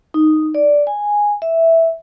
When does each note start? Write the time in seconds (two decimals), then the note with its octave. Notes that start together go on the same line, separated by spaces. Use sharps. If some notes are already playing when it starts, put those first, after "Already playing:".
0.14 D#4
0.55 D5
0.87 G#5
1.42 E5